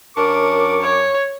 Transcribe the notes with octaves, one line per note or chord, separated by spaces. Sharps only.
F#2 D4 A#4 C#6 D6
C#5